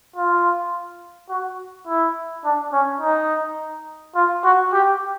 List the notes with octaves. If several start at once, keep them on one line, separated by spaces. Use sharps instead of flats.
F4
F#4
E4
D4
C#4
D#4
F4
F#4
G4